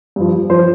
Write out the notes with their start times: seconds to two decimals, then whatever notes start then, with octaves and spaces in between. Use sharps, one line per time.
0.16 G2 F3
0.50 F3 C5